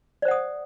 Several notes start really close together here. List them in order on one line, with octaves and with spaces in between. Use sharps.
D5 C5 F#5 D#6